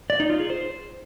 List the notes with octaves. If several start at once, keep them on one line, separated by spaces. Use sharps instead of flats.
D5
D#4
F4
G#4
C5